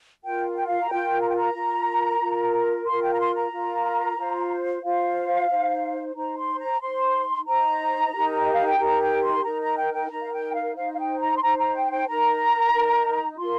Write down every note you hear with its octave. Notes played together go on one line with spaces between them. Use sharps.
F4 A#4 G5
G5
F5
A#5
F4 A#4 G5
A#5
G5
A#5
F4 A#4
F4 A#4
F4 A#4 C6
G5
A#5
C6
A#5
F4 A#4
F4 C5
F4 C5 F5
D#4 C5
D#4 C5 A#5
C6
A#5
D#4 C5 C6
D#4 C5 A#5
D#4 G4 A#4
D#5
F5
G5
D#4 G4 A#4 A#5
G5
C6
D#4 A#4 A#5
A#5
G5
G5
D#4 A#4 A#5
F5
G5
F5
D#4 C5 F5
F5
G5
A#5
C6
D#4 C5 A#5
A#5
G5
G5
D#4 A#4 A#5
D#4 A#4
F4 A#4 C6